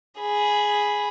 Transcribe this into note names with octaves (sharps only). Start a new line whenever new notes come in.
G#4 B5